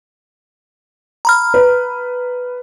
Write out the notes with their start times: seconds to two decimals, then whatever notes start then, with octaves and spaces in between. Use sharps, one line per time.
1.25 A#5 B5 F6
1.54 B4